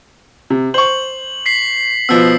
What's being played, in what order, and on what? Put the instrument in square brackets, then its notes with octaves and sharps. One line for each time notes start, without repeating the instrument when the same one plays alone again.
[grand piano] C3
[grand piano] C5 C#6 [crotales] F#7
[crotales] B6 C7 F#7
[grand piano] B2 F3 B3 [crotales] E6